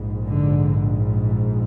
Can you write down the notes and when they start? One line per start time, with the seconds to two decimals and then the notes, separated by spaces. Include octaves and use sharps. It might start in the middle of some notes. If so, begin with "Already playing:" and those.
Already playing: A#1 G#2
0.25 D3